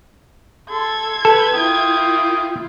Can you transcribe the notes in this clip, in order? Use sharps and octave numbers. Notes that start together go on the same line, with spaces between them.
A4 C6 G#6
A4 B4
E4 F4 G5 D#6